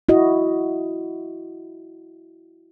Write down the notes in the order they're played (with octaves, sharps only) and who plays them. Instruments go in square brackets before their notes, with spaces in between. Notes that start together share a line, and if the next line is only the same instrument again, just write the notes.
[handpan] E4 F#4 D#5